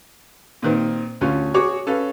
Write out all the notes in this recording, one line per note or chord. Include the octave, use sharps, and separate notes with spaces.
A#2 D#3 C4
D2 C#4 F4
F#4 G#4 C#5 D6
C#4 A4 B4 F5